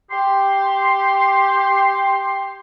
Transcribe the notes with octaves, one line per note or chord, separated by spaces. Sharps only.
G4 C6